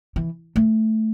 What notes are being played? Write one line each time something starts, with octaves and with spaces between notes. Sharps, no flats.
E3
A3